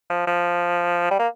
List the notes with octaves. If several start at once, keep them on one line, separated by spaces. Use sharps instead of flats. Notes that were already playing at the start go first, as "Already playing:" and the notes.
F3
F3
G3
A#3